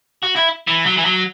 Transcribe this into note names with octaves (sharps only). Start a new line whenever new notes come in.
F#4
E4
E3
F#3
E3
F#3